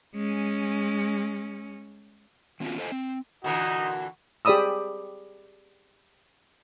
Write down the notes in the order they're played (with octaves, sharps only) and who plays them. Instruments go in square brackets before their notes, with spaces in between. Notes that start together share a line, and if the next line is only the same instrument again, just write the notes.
[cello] G#3 C#4
[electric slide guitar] D#3 B3 C#4 F4 F#4
A4 C5 D#5 F5 G#5
C4
[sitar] A#2 D3 E3 [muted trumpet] D#4 [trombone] F#4
[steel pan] G4 G#4 D5 B5 D#6 E6